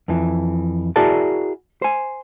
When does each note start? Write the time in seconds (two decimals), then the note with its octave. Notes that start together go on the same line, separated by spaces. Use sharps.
0.08 F2 E3
0.96 E4 F#4 G#4 A#4 D5 A5
1.82 C5 G#5